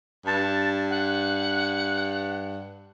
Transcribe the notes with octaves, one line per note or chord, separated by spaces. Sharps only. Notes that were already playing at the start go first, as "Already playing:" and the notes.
G2 A5
F#5